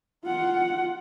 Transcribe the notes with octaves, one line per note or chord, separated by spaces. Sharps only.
F4 F#5